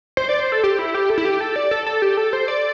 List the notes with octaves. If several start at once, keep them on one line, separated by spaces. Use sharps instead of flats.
C5
D5
C5
A4
G4
E4
G4
A4
E4
G4
A4
D5
A4
A4
G4
A4
C5
D5